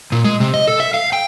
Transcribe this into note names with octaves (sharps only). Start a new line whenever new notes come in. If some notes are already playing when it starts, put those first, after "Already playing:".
A#2
G#3
C3
D#5
A4
E5
F5
G5